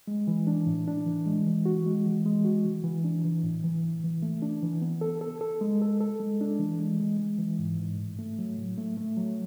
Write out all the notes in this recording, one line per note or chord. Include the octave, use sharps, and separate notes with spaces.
G#3
E3
D4
A2
D4
E3
G#3
E3
F#4
G#3
E3
G#3
F#4
E3
E3
D4
E3
A2
E3
A2
E3
A3
D4
E3
B3
A4
A4
A4
G#3
A4
A4
G#3
D4
E3
G#3
G#3
G#3
E3
G#2
G#2
A2
A3
F#3
A2
A3
A3
F#3